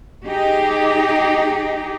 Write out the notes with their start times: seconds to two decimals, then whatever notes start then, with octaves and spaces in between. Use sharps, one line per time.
0.25 D#4 G4 G#4